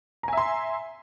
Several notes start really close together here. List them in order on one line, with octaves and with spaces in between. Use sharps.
A#5 G#5 E5 C6